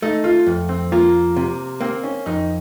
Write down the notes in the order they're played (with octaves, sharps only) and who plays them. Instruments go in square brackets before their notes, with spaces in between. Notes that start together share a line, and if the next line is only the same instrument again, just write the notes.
[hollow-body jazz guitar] A3 [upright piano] D#4
[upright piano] F4
[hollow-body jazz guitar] F2
[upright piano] C4
[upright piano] A#3 [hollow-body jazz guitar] F4
[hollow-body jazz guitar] C3
[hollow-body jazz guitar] A#3 [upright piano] C4
[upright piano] C#4
[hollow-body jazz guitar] F2 [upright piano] D#4